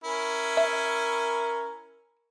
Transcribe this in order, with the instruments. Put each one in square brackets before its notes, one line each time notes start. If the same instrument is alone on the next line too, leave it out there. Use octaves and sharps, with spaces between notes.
[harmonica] C#4 E4 [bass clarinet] A#4
[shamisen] E5